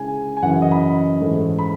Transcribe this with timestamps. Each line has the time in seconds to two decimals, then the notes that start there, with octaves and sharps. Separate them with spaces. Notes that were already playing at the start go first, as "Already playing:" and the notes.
Already playing: C#3 G#3 C#4 E4 G#5
0.37 G#5
0.43 F#2 C#3 E3 F#5
0.62 D#5
0.72 B5
1.20 G#2 E3 A3 C#4
1.59 B5